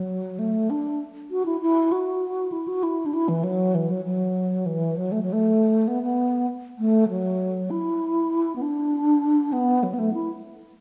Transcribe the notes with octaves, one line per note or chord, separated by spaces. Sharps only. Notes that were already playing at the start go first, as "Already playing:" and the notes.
Already playing: F#3
A3
D4
F#4
E4
E4
F#4
E4
F#4
E4
D4
E4
E3
F#3
E3
F#3
F#3
E3
F#3
A3
F#3
A3
B3
B3
A3
F#3
E4
B3
D4
B3
F#3
B3
A3
E4